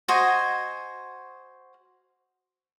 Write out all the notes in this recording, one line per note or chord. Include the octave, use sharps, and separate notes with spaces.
F#4 C5 D#5 G#5